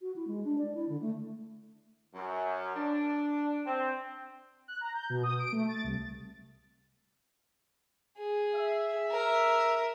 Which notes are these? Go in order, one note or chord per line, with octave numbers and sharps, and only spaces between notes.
F#4
E4
G#3
D4
D5
E4
D3
A3
F#2
D4
C4
F#6
A#5
G6
B2
D#6
D7
A3
A6
C2
G#4
E5
A#4